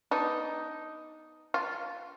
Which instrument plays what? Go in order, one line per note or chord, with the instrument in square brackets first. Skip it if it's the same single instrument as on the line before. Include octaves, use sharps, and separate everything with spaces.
[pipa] B3 D#4 [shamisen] D4
[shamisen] F4